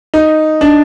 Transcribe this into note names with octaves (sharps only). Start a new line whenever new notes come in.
D#4
D4